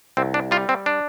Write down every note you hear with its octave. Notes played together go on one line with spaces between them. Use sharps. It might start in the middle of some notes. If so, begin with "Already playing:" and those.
C2 C4
D4
G3 F4
C4
D4